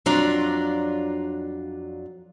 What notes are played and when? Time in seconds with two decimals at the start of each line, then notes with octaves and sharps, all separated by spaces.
0.06 F2 F#3 D4 F4 D5 A#5